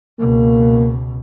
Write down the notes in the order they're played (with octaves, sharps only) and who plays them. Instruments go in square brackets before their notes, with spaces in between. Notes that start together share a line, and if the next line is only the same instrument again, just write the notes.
[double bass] C#2 B2 [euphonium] A#3